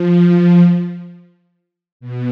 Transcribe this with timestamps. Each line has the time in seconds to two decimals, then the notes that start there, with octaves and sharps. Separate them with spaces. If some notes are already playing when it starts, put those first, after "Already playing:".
Already playing: F3
2.00 B2